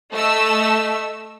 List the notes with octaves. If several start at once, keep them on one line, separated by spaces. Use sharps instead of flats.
A3 D#5 E6